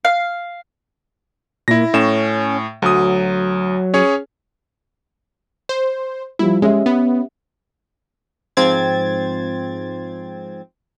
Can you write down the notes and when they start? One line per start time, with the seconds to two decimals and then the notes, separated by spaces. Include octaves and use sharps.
0.05 F5
1.68 A#2 E4 A#6
1.94 A2 C#4 E7
2.82 D2 F#3 D#6
3.94 C#4 G#4 C#5
5.69 C5
6.39 F3 G3 E4
6.62 G#3 C#4 G4 E5
6.86 B3
8.57 G#2 F3 C4 G#6 A6